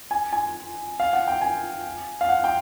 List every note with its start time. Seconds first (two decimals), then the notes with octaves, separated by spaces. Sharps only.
0.11 G#5
0.33 G#5
1.00 F5
1.13 F#5
1.28 G5
1.41 G#5
2.21 F5
2.29 F#5
2.44 G5